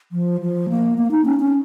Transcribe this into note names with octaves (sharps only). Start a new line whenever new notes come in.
F3
F3
A#3
A#3
D#4
C#4
C#4